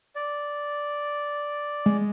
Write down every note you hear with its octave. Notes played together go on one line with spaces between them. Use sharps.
D5
G#3